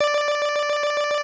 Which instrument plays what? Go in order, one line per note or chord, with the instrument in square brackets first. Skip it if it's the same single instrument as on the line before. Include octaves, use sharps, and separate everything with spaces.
[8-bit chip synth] D5